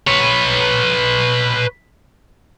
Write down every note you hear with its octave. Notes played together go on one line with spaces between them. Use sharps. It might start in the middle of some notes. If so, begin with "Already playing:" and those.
B4 C#5